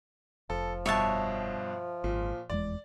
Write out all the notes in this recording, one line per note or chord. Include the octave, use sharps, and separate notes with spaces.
F1 F3 A4
G2 B2 C#5 E5 A5
G#1 A#2
F1 E2 G#3 D5